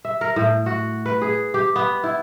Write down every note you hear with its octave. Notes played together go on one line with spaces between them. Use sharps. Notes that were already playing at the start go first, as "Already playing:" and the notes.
E5
A#4
A2
F#4
B4
G#4
G4
B3
E4